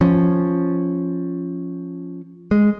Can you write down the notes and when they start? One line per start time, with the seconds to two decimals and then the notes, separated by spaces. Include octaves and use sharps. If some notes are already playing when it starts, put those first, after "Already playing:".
0.01 F3 C#4
2.51 G#3